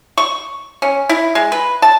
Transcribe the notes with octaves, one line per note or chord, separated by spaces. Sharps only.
C#6
C#4
E4
G#3
B4
A5